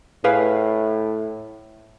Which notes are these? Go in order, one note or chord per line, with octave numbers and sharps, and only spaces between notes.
A2 G#4 B4 F5